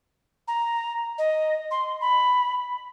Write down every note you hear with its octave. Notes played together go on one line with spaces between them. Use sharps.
A#5
D#5
C6
B5